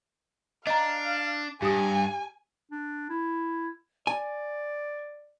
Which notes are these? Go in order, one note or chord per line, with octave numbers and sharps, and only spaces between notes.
D4 D#5 F5 A#5
G2 G4 G#5 D#6
D4
E4
D5 G#5